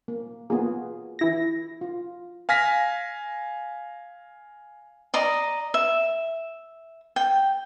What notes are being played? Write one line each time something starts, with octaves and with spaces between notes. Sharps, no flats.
A#3
B2 A#3 B3 F4 G#4
E3 E4 A#6
F4
F5 G#5 F6 A#6 B6
D5 D#5 A#5
E5
G5